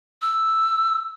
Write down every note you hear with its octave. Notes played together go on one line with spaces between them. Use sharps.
E6